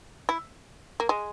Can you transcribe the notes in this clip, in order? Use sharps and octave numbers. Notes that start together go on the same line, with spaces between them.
E4
A#3
G#3